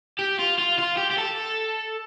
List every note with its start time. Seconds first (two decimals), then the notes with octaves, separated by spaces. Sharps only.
0.19 G4
0.39 F4
0.59 F4
0.79 F4
0.97 G4
1.11 G4
1.18 A4